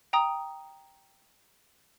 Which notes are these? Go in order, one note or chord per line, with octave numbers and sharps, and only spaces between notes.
G5 A#5 D#6